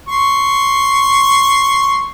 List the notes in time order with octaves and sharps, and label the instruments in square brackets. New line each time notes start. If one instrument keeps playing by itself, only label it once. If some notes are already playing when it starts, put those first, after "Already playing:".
[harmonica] C6 C#6